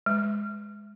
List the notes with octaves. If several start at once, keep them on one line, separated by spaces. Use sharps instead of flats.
G#3